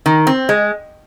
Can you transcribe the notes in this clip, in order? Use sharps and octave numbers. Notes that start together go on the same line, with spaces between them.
D#3
C4
G#3